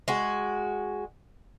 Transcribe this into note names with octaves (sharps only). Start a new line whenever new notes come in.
G#3 F#4